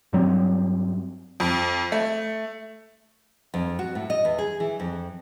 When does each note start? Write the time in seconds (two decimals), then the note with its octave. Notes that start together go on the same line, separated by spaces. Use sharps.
0.13 G2 F#3 G3 C4
1.40 F2
1.92 A3
3.54 F2
3.79 F#4
3.95 A2
4.10 D#5
4.25 E2
4.38 G#4
4.60 E3
4.80 F2